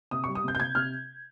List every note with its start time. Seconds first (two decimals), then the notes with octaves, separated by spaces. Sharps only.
0.11 C3 D#6
0.24 G3 C#6
0.35 D#6
0.44 C3 G6
0.55 G6
0.60 C3 G#6
0.75 C3 F6